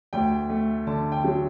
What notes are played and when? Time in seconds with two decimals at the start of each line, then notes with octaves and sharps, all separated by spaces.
0.13 D2 G5
0.50 A3
0.87 D3 A5
1.12 G5
1.24 F#3